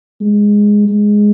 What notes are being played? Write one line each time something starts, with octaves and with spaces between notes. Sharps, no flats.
G#3
G#3